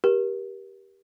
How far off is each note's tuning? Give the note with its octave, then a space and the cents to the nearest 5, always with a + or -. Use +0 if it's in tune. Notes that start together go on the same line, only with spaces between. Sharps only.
G4 +0 A#4 +35